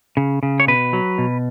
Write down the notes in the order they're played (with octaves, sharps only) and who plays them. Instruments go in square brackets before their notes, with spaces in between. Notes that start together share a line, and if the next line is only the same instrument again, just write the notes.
[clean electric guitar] C#3
C#3
C#5
B2 B4
F#3
B2